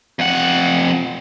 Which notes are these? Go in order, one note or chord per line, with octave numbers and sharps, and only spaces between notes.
F2 F#5